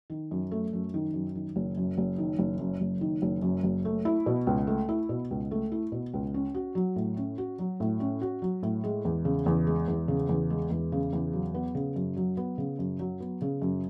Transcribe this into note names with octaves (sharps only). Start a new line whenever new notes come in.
D#3
F#2
A3
F#2
D#3
F#2
D#3
F#1
F#2
F#1
D#3
F#1
F#2
F#1
D#3
F#1
F#2
F#1
A3
E4
B2
C#2
A3
E4
B2
C#2
A3
E4
B2
C#2
C#4
F#4
F#3
A2
C#4
F#4
F#3
A2
C#4
F#4
F#3
A2
G#3
E2
C#3
E2
G#3
E2
C#3
E2
G#3
E2
C#3
E2
F#3
B3
C#3
F#2
F#3
B3
C#3
F#2
F#3
B3
C#3
F#2